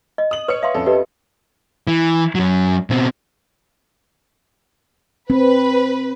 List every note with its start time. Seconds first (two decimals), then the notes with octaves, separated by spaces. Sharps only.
0.18 D#5
0.31 D#6 F#7
0.48 B4 C#5 D#6 C#7
0.63 E5 F5 C6
0.74 F2 C#4 A4
0.86 G4 B4 D#5
1.87 E3
2.35 F#2 F#3
2.90 B2 C4
5.30 C4 B4